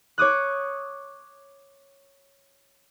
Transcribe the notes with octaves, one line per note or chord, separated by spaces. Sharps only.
C#5 D6 D#6 F#6